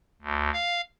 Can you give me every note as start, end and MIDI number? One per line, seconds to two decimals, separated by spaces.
0.22 0.50 38
0.53 0.81 77